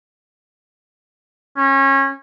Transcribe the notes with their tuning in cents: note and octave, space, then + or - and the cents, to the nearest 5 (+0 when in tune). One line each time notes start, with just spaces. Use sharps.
C#4 -25